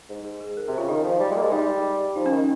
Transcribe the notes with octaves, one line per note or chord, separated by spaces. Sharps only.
G#2
G#4
G#4
A#4
C3 G#4
C#3 F4
D#3 D#4
F3
G3
G#3
A#3
G#3
G3 D#4
F3 D#4
C#4
D#3
D#4